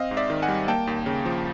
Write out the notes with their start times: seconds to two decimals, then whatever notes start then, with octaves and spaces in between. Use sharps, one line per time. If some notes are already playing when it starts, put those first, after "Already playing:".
Already playing: C4 D#5 F5
0.11 G#2
0.17 D5 E5
0.30 D#3
0.42 F#5 G#5
0.48 G3
0.68 A#3 G5 A5
0.87 D#2
1.06 C#3
1.25 F3